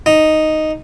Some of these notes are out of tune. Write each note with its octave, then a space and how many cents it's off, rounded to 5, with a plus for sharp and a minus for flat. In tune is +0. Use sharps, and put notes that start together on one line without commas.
D#4 +0